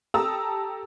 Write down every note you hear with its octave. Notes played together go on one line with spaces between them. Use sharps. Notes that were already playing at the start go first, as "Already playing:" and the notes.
G4 A4 A5 A#5 D#6 E6